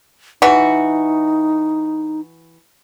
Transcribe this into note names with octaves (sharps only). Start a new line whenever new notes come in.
E3 D#4 F#4